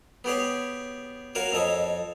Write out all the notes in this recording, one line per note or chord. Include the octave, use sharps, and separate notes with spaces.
B3 G4 G#4 C#5
F#4 A#4 C#5 F5
F2 A4 C#5 D#5